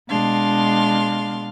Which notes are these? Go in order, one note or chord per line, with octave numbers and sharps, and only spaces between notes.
B2 G#3 D4 F5 C6